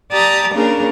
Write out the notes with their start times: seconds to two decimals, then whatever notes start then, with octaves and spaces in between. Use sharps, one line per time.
0.11 G4 D5 A5 A#5 D#6
0.53 C#3 A#3 D4 G#4 A#4